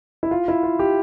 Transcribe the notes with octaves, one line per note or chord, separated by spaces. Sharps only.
E4
F4
E4
F4
G4